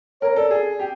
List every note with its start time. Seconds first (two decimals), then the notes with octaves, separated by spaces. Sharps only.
0.21 A#4 C#5
0.36 A4 D5
0.51 G#4
0.79 G4